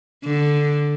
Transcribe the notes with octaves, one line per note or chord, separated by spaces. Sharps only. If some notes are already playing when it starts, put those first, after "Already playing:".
D3